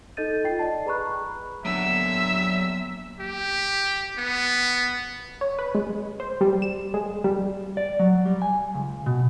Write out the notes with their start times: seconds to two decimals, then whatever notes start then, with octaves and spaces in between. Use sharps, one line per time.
0.17 D#4 A4 D#5 G6 A6 D#7
0.44 F4 G5 A6 C7
0.59 D5 D#5 A5
0.86 G#4 B4 A#5 B5 C#6 F#6
1.65 F#3 A#3 B3 D4 E5 F#5 E6
3.20 G4
4.18 B3
5.41 C#5
5.59 B4
5.75 G#3
6.20 C5
6.41 G3
6.62 E7
6.94 G#3
7.24 G3
7.77 D5
7.99 F#3
8.26 G3
8.42 G#5
8.74 C#2
9.06 B2